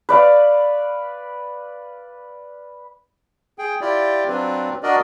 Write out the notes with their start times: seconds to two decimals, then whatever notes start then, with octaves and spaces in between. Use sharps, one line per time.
0.09 B4 D5 F5
3.59 G#4 G5
3.81 E4 F4 G4 D5
4.28 F#3 C4 D4 F4 B4
4.83 D4 F#4 A#4 D5 D#5